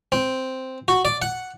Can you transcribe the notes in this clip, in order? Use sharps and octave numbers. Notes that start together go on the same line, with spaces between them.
C4
F#4
D5
F#5